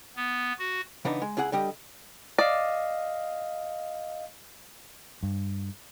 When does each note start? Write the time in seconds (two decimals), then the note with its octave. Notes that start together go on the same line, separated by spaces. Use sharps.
0.16 B3
0.59 F#4
1.05 C#3 E3 B3 D4 D#4
1.22 G#3
1.37 C#2 E4 G#4 F#5
1.52 D3 G3 G4 D#5
2.38 D5 D#5 F5
5.23 G2